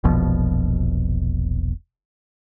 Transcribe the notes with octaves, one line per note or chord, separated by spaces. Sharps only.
E1 A#1 B2 F3